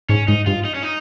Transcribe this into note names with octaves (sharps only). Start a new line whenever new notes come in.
G#2 C#4
G#2 D#4
G2 F4
D#4
C#4
D#4